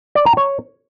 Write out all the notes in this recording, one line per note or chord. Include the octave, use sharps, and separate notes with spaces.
D5
A#5
C#5